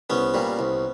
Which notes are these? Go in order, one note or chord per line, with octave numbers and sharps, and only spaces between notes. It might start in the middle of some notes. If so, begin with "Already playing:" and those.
C2 B3 C#4
A#2 G3
C2